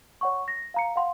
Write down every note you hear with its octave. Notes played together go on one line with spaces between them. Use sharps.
C#5 F#5 C#6
A#6
F5 A#5 C#7
F5 F#5 C6